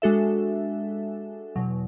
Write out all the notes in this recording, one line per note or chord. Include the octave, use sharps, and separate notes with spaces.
G#3 D4 F#4 A4 E5
E2 B2 F#3